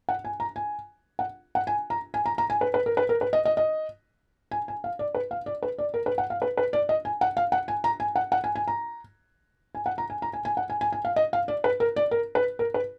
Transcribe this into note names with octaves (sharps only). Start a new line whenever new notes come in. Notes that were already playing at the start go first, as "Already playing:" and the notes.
F#5
G#5
A#5
G#5
F#5
F#5
G#5
A#5
G#5
A#5
A#5
G#5
B4
B4
A#4
B4
A#4
B4
D#5
D#5
D#5
G#5
G#5
F5
D5
B4
F5
D5
B4
D5
A#4
B4
F#5
F5
B4
B4
D5
D#5
G#5
F#5
F5
F#5
G#5
A#5
G#5
F#5
F#5
G#5
G#5
A#5
G#5
F#5
A#5
G#5
A#5
G#5
G#5
F#5
G#5
G#5
G#5
F5
D#5
F5
D5
B4
A#4
D5
A#4
B4
A#4
B4